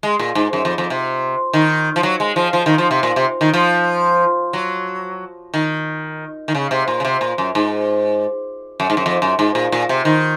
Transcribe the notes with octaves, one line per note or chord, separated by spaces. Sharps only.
G#3
A#2
G#2
F#2
F2
F2
C3
D#3
F3
F#3
G#3
F3
F3
D#3
F3
C3
A#2
C3
D#3
F3
F#3
D#3
D#3
C#3
C3
A#2
C#3
C3
A#2
F#2
G#2
F#2
G#2
F#2
F2
F#2
G#2
A#2
A#2
C3
D#3